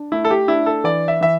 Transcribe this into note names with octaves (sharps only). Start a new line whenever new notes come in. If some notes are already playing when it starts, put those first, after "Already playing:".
Already playing: D4
A3 E4
A4
G4
D4 E4
A4
E3 D5
E5
E3 E5